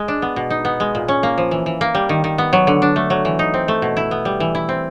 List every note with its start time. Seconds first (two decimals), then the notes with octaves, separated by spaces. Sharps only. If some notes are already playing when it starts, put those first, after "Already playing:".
Already playing: G#3
0.08 D4
0.22 B3
0.36 B2
0.50 D#4
0.65 B3
0.80 G#3
0.95 A#2
1.08 C#4
1.23 A#3
1.38 F3
1.51 E3
1.66 E3
1.81 A#3
1.95 G3
2.09 D#3
2.24 D#3
2.38 B3
2.53 F#3
2.67 D3
2.82 D4
2.96 A3
3.10 F#3
3.25 E3
3.39 D#4
3.54 C4
3.68 A3
3.82 B2
3.97 E4
4.11 B3
4.25 G3
4.40 E3
4.55 E4
4.69 C4